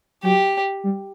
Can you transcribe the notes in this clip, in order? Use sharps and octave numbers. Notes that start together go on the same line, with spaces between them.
F#3 G4
G3